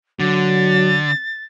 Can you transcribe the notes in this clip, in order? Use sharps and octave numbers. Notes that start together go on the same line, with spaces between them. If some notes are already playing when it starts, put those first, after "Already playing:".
D3 F#3 A6